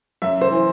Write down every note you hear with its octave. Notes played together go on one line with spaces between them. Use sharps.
F#2 E5
C5
E3